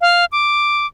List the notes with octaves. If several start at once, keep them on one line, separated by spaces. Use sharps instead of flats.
F5
D6